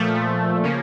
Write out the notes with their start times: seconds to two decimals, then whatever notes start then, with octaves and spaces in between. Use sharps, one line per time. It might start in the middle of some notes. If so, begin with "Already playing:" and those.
Already playing: A#2 F3 A3
0.63 C#3 F3 A#3 C#4